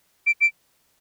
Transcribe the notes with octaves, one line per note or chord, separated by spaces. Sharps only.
D7
D7